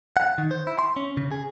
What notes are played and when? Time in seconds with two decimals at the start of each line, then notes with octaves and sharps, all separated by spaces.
0.17 F#5
0.38 D#3
0.51 C5
0.67 E4
0.79 C6
0.96 C#4
1.17 C#3
1.31 G#4